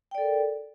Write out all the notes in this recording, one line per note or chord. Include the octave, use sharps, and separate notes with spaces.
A4 A#4 D5 G5